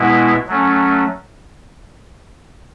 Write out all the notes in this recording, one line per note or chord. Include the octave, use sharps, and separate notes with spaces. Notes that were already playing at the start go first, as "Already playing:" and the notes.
Already playing: B2 G#3 B3 E4
F#3 A3 C#4